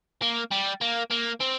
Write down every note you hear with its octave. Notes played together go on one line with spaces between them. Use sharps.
A#3
G3
A#3
A#3
C4